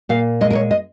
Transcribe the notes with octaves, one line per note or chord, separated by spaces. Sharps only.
A#2 F5
G#3 D#5
A#4
C#5
D#5